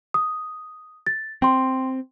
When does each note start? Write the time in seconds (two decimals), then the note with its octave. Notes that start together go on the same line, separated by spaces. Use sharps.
0.14 D#6
1.07 A6
1.42 C4 G5 C6